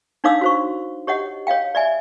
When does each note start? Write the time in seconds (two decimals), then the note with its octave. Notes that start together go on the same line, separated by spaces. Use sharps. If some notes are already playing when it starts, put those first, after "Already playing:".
0.24 D4 D#4 C#5 F5 D6 E6
0.41 F#4 C5 C#6
1.07 G4 C#5 D#5 F#5
1.47 C#5 D#5 F5 G5
1.75 D5 E5 G#5